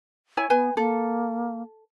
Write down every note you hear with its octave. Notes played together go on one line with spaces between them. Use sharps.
E4 C#5 G#5
B3 B4 G#5
A#3 A4